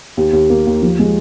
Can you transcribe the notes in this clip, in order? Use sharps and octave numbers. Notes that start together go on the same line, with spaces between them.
D#2
D#2
A#3
D#2
F3
G#3